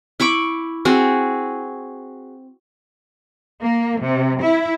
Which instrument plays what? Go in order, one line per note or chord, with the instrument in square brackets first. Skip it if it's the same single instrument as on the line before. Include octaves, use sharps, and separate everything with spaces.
[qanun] E4 B5 C#6 D6
C4 F#4 G#4
[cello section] A#3
C3
E4